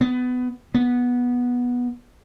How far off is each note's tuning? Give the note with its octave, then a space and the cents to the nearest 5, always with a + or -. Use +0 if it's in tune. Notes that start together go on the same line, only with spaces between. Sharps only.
B3 +20
B3 -10